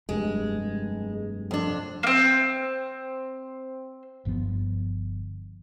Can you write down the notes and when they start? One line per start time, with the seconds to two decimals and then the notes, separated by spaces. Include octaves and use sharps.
0.09 F1 G2 G#3
1.51 F2 D4
2.03 A#3 C4
4.25 G1 G2 F3 B3